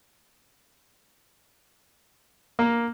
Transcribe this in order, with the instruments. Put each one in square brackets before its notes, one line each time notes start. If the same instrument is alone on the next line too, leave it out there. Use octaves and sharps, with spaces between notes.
[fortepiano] A#3